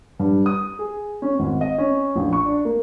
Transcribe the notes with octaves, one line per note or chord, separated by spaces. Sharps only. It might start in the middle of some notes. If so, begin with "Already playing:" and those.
G2
D#6
G#4
C#4
G#1
D#5
C#4
A#1
C#6
D4
A#3